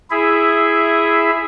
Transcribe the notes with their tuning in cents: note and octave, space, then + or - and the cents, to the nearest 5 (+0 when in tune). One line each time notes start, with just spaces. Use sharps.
E4 +10 G#4 +0 E5 +0